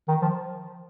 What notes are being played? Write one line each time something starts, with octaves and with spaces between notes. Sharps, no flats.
D#3
F3